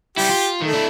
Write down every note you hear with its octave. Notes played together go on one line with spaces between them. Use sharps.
G3 E4 G4
F4
D#3 A3
D4 E4